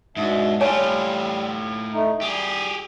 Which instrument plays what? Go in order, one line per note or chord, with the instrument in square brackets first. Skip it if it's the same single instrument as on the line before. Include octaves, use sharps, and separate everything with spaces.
[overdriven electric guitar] G#2 [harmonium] B2 D4 E5
[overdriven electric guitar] A2 F4 [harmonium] G3 [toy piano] C#5 G#5 A5
[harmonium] A3 D#4
[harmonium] G3 [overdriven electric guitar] G4 G#4